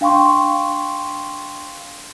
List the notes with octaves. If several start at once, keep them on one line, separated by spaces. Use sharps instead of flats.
D4 F5 G5 C6 C#6